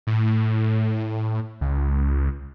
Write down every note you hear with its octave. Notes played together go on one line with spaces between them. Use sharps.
A2
C#2